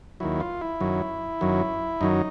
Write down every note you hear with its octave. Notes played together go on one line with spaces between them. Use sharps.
D#2 D#3 F#3 E4
F4
E4
F#2 D#3 F#3
F#2 D#3 F#3
F#2 D#3 F#3 D#4